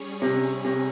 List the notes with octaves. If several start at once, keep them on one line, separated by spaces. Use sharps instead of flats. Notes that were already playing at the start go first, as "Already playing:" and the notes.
Already playing: G3 C#4 G#4 C#5
C3
C3